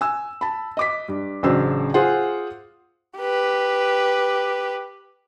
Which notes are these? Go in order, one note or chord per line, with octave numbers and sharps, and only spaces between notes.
G#5 E6
A5 B5
D#5 D6 B6
G2
A1 C#3 F#3 D4 C5 E6
F4 G#4 C5 F#5
G4 B4